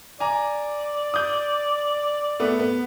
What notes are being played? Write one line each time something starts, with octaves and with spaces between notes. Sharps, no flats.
D5 G#5 A#5
D#6 G6
A3 B3
B3